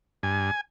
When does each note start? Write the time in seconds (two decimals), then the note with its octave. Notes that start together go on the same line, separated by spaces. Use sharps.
0.23 G2 G#5